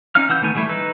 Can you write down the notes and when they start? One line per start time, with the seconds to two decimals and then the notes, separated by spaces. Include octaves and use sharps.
0.15 C#4 D#4 F5 F6
0.29 E3 F#5 E6 G6
0.42 D#3 A3 B3 G#5
0.55 E3 G3 A3 E4
0.69 D#4 B4 E6